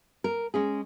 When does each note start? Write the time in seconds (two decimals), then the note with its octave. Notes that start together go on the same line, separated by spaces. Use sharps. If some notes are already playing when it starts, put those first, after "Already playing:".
0.24 A#4
0.54 G#3 C#4 G#4